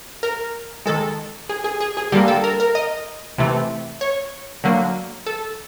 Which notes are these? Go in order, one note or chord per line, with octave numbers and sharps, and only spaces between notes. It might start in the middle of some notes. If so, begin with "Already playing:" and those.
A#4
D#3 G#3 A4
G#4
G#4
G#4
G#4
D3 G3 A#3 G4
A4
A#4
A#4
D#5
C3 E3 A3
C#5
D3 F#3 A#3
A4